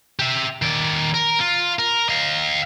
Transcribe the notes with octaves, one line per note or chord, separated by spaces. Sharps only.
G4 E5
D#3 D5
A#4
F4
A#4
D#5 F5